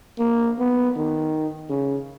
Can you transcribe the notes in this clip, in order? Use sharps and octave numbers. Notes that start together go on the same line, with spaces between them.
A#3
B3
D#3
C#3